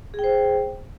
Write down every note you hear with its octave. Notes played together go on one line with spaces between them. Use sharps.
G#4 C5 G5